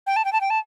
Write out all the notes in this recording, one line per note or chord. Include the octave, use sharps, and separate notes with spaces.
G5
A5
G5
A5
G5
A5